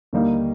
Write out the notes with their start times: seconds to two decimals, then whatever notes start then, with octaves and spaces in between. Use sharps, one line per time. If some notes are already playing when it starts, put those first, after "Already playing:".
0.13 D#2 D3 G3 A#3 D#4